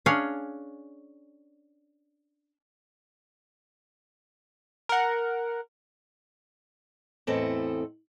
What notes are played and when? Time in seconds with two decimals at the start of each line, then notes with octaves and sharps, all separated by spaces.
0.06 C#4 D4 G#4 C#5 F5
4.89 A#4 F#5
7.27 E2 A2 C4 E4 A4 D#5